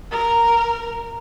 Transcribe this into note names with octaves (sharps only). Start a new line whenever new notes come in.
A#4